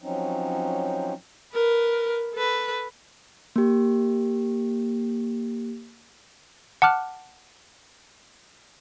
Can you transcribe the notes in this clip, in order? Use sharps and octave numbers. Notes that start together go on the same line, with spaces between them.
F3 F#3 C4 C#4 D#4
A#4 B4
A4 B4
A#3 G4
F#5 A5 D6 F6 F#6